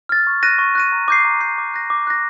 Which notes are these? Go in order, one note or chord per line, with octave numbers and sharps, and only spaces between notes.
F6 A6
C#6
F#6 A#6 D#7
C#6
F#6 A#6 D#7
A#5
D6 G6 C7
A#5
D6 G6 C7
D6
F#6 A#6
D6
F#6 A#6